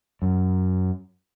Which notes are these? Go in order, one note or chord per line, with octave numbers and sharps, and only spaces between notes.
F#2